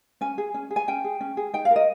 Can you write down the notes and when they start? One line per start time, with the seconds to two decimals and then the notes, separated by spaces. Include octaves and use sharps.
0.21 C#4 G#5
0.38 G#4
0.54 C#4
0.71 G#4
0.76 G#5
0.88 C#4 G5
1.04 G#4
1.21 C#4
1.37 G#4
1.53 D#4 G5
1.65 F5
1.71 A#4
1.76 D#5